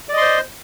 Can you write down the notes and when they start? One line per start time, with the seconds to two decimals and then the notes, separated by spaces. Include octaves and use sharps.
0.09 D5
0.13 D#5
0.17 C6
0.22 C5